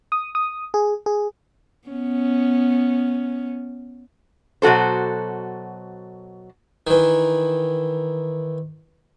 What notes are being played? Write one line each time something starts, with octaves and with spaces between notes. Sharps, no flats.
D#6
D#6
G#4
G#4
B3 C#4
B2 F#3 F#4 A4 C5
D#3 E3